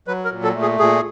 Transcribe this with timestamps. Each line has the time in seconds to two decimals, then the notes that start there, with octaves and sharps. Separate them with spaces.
0.07 F#3 B4
0.25 A#4
0.32 A#2
0.43 A4
0.55 A3
0.62 G#4
0.79 A#2 G#4